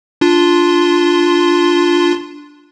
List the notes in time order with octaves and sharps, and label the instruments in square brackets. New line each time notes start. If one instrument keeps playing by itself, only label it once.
[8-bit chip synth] D4 F4 C6